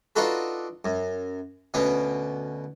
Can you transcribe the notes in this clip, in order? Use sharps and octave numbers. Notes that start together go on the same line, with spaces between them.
D4 D#4 F4 F#4 A4 B4
F#2
D2 B2 B3 C#4